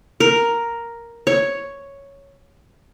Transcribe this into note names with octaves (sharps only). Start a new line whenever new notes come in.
A#4
C#5